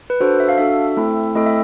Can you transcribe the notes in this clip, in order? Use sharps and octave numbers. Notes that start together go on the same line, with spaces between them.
B4
D4 F#4 A4 C5
E5
F5
D4 F#4 A4 E5
A3 C4 E4 A4
A3 C4 E4 A4 D#5
E5